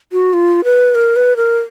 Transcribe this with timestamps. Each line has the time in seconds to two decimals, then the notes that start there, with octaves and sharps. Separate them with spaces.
0.12 F#4
0.33 F4
0.64 B4
0.95 A#4
1.16 B4
1.37 A#4